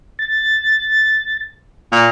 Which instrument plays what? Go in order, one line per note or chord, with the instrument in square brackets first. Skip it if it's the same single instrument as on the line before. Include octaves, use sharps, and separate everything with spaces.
[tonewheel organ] A6
[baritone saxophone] A#2